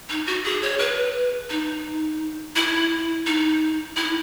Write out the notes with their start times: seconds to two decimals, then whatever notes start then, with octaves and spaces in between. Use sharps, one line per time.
0.09 D#4
0.27 F#4
0.44 G#4
0.62 C#5
0.79 B4
1.49 D#4
2.56 E4
3.26 D#4
3.96 E4